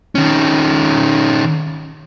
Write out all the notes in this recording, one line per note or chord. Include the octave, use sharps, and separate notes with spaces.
D#3 C#4